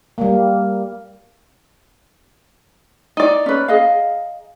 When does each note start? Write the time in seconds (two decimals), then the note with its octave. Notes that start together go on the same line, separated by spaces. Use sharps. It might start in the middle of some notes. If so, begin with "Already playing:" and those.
0.18 G3 A#3
3.17 D#4 D5
3.46 C#4 B4
3.68 G#4 D#5 F5